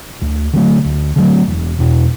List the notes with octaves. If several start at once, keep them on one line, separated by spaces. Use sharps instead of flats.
D2
D3 F#3 A3
D2
D3 F#3 A3
E1
E2 B2